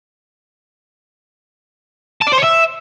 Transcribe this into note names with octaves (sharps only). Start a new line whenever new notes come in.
A5
D5
C5
C#5
E5